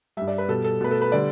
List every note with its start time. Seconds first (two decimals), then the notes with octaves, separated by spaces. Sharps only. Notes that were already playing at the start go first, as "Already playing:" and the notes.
0.17 G2 G3 E5
0.28 D5
0.38 B4
0.48 B2 G3 A4
0.64 A4
0.81 B2 A3 B4
0.91 A4
1.02 B4
1.12 D3 G3 D5